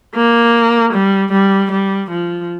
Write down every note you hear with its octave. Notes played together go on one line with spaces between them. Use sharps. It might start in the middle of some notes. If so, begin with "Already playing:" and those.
A#3
G3
G3
G3
F3